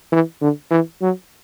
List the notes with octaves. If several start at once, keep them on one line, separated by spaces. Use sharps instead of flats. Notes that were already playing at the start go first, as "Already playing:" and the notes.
E3
D3
E3
F#3